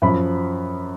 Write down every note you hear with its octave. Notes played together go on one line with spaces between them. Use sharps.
F#2 F3 B5